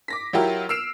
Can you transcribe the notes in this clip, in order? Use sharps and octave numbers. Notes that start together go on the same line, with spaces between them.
D6 A#6 B6
F#3 E4 F4 G4 A#4
E6 F6 C7 D7 E7